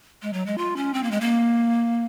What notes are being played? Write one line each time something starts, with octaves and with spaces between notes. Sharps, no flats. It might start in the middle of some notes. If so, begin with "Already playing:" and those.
G#3
F#3
G#3
F4
C#4
C4
A#3
G#3
A#3